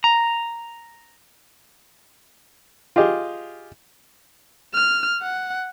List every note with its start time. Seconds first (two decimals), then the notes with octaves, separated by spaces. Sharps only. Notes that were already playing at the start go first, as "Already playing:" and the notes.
0.04 A#5
2.96 F4 G4 G#4 D#5
4.75 F6
5.22 F#5